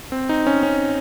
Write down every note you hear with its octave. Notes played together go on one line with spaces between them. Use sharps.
C4
D#4
C#4
C#4